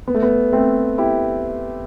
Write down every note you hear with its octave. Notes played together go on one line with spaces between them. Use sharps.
B3
A3
B3
A3 C4
E4 G4